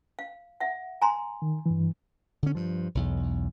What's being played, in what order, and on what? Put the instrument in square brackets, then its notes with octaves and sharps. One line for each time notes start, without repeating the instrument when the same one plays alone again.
[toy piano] F5
E5 F#5
G#5 A#5 C6
[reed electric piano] D#3
G2 E3
[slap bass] D3 C#4
G2 F3
B1 E2